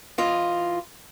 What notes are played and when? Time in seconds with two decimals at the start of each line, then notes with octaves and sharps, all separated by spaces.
0.18 E3 F4 D#5